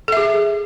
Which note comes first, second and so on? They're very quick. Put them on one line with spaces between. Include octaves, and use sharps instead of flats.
A4 E5 G#4